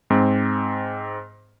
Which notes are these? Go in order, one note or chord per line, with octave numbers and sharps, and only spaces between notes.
G#2 C4